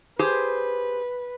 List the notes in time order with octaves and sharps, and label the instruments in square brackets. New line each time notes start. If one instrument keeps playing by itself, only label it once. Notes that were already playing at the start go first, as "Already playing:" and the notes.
[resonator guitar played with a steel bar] G4 G#4 C5 [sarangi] B4